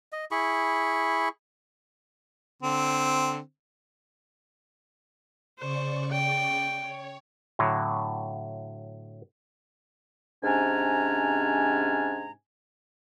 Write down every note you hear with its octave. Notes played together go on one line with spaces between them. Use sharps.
D#5
E4 G#4 B5 C#6
D3 C4
C#3 C5 D5 C#6
G5
C#5
A2 D3 F#3
G#2 C3 C#4 D4 G#5 A#5